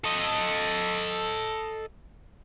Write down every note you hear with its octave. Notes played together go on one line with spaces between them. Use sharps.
A4 D#5